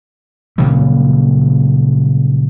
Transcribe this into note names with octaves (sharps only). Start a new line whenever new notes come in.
A#2 C#3 F#3 G3